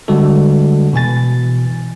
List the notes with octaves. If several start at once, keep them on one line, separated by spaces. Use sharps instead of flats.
D3 G3 G#3 F#4 A4
B2 E3 G#5 A6